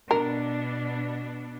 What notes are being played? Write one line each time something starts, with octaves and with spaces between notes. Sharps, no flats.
B2 B3 D4 A#4